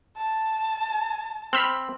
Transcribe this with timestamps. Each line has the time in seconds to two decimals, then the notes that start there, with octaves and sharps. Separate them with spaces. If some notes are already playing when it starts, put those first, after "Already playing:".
0.17 A5
1.53 C4 B5 E6 F6